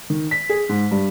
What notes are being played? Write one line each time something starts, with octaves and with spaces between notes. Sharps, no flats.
D#3
B6
G#4
G#2
G2